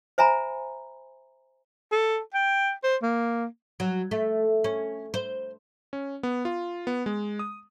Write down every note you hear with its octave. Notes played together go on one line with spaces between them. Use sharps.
C5 E5 G#5 A#5 B5
A4
G5
C5
A#3
F#3
A3
C#4
C5
C#4
B3
F4
B3
G#3
D#6